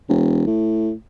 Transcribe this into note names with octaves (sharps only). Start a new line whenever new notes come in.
E1
A2